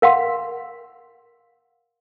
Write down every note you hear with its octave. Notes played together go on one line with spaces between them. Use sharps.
A#4 F5 F#5 C6